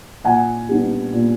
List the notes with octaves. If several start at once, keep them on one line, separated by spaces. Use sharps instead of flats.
A#2 F#5 G#5
G3 B3 D4
A#2